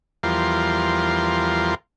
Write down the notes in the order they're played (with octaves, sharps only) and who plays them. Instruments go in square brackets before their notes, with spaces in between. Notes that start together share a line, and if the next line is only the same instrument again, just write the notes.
[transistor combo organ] E2 F3 G3 F4 A#4 C6